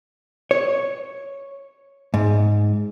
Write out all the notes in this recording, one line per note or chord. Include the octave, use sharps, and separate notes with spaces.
C#5
G#2